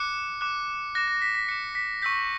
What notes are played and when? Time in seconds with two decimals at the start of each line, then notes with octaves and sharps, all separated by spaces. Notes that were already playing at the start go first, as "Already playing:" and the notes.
Already playing: D6 F#6 C#7
0.41 D6 F#6
0.95 D6 F#6 A#6
1.08 A#6
1.22 B6
1.35 B6
1.48 D6 F#6 C#7
1.75 B6
2.02 C#6 E6 G6 B6